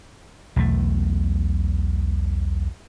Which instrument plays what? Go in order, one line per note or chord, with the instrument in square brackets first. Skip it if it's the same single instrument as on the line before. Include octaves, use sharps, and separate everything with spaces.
[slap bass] B1 E2 A3